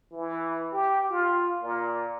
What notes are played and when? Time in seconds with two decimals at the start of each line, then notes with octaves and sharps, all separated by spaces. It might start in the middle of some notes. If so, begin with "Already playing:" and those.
0.12 E3
0.72 G4
1.10 F4
1.62 A#2